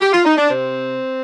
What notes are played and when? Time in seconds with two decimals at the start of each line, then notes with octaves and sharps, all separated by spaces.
0.01 G4
0.13 F4
0.25 D#4
0.38 D4
0.50 C3 C4